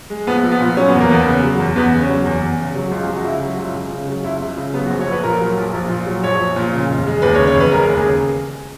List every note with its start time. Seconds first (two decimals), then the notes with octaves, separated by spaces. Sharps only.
0.10 G#3
0.27 A#1 B3
0.44 A#1
0.52 B3
0.60 A#2
0.77 F#3 C#4
0.89 E2 B3
1.00 A#3
1.09 E2 B3
1.26 C#3
1.43 F#3
1.60 E2
1.76 E2 B3
1.92 C#3
2.01 C#4
2.09 F#3
2.25 E2
2.42 E2
2.59 C#3
2.75 F#3
2.92 C#2
3.09 C#2
3.16 F#4
3.24 C#3 E4
3.42 F#3
3.58 C#2
3.74 C#2
3.91 C#3
4.08 F#3
4.24 C#2 E4
4.41 C#2
4.58 C#3
4.74 F#3 B3
4.86 F#4
4.90 A#1
5.01 C#5
5.07 A#1 B4
5.23 A#2 A#4
5.41 F#3
5.57 A#1
5.74 A#1
5.89 A#2
6.06 F#3
6.23 A#1 C#5
6.39 A#1
6.56 A#2
6.73 C#3
6.90 E1
7.06 G#3
7.22 D#2 B4
7.34 C#5
7.39 C#3
7.47 C#5
7.55 E1 B4
7.72 G#3 A#4
7.89 D#2
7.97 G#4
8.05 C#3